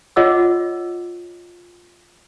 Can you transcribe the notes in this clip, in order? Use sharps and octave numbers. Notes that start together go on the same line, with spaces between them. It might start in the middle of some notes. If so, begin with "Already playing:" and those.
F4 C#5 D#5 F#5 D6 E6